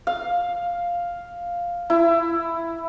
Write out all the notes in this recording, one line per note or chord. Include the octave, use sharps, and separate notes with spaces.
F5
E4